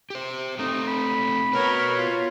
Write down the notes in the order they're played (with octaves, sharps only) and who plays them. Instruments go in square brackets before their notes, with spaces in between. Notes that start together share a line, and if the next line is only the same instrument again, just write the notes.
[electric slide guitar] G4 C5
[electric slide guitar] A3 C4 [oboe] D#4
[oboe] B5
[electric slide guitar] B3 F#4 B4 [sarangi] A#4 [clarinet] C#5
[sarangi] F4